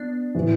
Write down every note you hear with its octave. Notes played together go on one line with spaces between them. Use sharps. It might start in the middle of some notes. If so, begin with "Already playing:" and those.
Already playing: B3 D4
A2 E3